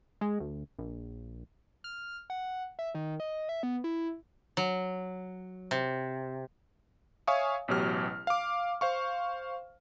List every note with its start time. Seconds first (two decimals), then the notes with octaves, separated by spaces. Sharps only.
0.21 G#3
0.40 D2
0.79 A#1
1.84 F6
2.30 F#5
2.79 E5
2.95 D#3
3.20 D#5
3.49 E5
3.63 B3
3.84 E4
4.57 F#3
5.71 C3
7.27 C#5 E5 F5 G#5 C#6 D#6
7.68 A1 B2 F#3 G4 F6
8.27 F5 D6
8.81 C5 F5 C#6